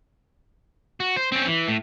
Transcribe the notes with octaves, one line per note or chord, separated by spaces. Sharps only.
F#4
C5
C4 C#4
E3
A2